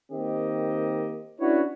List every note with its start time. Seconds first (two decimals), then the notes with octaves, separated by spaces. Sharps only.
0.12 D#3 A#3 C4 G4 D#5
1.40 C#4 D4 E4 F#4 B4 C#5